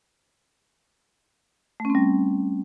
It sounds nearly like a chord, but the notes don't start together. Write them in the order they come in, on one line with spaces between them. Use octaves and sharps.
A3 C#4 C4 G3